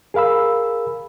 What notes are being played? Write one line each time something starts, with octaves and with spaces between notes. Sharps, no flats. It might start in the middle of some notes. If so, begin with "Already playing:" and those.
G#4 A#4 F5 B5 E6